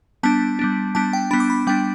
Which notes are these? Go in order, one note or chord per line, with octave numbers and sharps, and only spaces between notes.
G3 B3 D4 A5
G3 B3 D4
G3 B3 D4 A5
G5
G3 B3 D4 B5
D6
B5
G3 B3 D4 G5